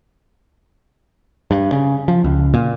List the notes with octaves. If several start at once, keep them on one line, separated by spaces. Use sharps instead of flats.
G2
C#3
F3
C#2
A#2